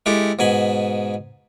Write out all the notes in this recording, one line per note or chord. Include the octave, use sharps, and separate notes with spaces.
G#3 E4 G4 A4
G#2 B2 G#5 B5